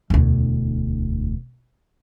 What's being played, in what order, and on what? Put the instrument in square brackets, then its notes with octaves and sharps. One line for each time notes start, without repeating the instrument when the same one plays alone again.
[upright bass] E1 D2